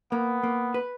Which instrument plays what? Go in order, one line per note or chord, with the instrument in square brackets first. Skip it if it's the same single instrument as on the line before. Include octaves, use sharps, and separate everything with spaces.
[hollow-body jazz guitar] A#3 [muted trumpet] B3
[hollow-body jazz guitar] A#3
B4